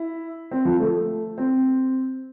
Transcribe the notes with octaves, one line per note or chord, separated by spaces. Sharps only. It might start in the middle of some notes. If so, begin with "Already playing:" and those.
Already playing: E4
C4
F3
A3
C4